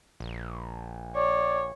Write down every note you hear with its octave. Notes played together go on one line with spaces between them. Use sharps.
A#1
C#5 D5